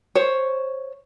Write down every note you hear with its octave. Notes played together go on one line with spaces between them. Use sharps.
C5 C#5